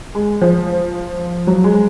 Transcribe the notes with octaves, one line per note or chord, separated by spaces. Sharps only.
G#3
F3
F#3
G#3